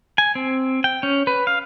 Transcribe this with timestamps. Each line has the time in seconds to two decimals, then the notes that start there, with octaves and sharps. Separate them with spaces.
0.18 G#5
0.35 C4
0.84 G5
1.03 C#4
1.27 B4
1.47 F5